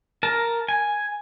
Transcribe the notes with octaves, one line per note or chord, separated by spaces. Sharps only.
A#4 A5
G#5